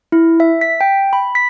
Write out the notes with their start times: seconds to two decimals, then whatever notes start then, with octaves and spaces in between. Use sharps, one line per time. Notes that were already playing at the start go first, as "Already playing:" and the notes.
0.12 E4
0.40 E5
0.61 B6
0.81 G5
1.13 B5
1.35 B6